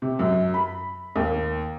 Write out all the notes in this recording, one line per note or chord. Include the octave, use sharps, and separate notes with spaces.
C3
F#2
B5
D#2